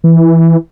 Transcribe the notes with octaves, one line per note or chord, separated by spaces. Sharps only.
E3